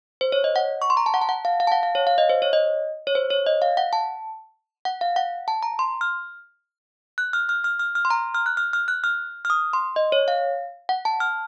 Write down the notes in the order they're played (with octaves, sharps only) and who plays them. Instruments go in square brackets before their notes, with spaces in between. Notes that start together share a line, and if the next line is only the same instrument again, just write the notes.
[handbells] C5
C#5
D#5
F#5
C#6
C6
A#5
A5
F#5
A5
F#5
F5
F5
A5
F#5
F5
C#5
F5
D#5
C5
C#5
D#5
C#5
C5
C#5
D#5
F5
F#5
A5
F#5
F5
F#5
A5
A#5
C6
F6
F#6
F6
F6
F6
F6
F6
C6
A#5
F6
F#6
F6
F6
F#6
F6
F6
D#6
C6
D#5
C#5
F5
F#5
A5
F6